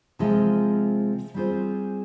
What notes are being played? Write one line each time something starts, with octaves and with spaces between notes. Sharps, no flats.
C3 F3 G#3 C4 F4
G3 C4 F4 G#4 C5